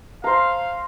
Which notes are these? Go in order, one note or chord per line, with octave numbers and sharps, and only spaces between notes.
C5 F5 A#5